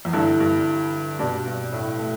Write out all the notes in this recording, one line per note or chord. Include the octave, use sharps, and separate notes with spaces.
E2
G2 D3 G3 E4 A4
G2
G2 B2 G3 D4
G2
A2
A3